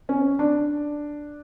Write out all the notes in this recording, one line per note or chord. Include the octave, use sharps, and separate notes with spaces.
C#4
D4